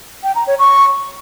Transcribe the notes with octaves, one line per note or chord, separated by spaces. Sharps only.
G5
A#5
C#5
C#6